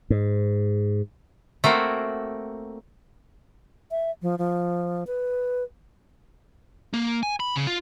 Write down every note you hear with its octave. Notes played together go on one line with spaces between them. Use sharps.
G#2
A3 A#3 C4 F#4
E5
F3
F3
B4
A#3
G#5
B5
C#3
F4